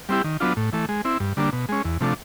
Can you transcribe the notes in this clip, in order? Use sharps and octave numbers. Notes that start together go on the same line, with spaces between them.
G3 C4 E4 G4
D#3
F#3 B3 D4 F4
A2
E3 A3
G#3
C4 E4
G2
D3 G3 A#3 D4
B2
G#3 C#4
E2
C3 F3 A3 D4